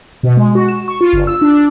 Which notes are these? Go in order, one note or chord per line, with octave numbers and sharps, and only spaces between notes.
B2
G#3
F#4
E7
C#6
F4
G1
E6
D4
D4